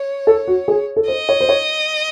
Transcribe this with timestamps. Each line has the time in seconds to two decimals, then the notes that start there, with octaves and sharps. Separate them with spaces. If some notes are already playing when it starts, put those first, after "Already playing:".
Already playing: C#5
0.27 A4
0.48 F#4
0.68 G#4
0.96 A4
1.08 C5 D#5
1.29 C#5
1.40 C5
1.49 C#5